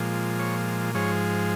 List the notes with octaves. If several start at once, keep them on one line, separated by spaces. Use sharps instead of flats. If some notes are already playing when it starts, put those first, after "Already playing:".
Already playing: A#2 F3 G#3
C#5
G#2 F3 G#3 C#5